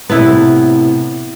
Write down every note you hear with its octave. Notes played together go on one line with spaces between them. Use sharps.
A2 C3 B3 E4